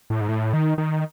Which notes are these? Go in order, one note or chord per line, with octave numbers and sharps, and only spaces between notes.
A2
G#2
A2
D#3
D#3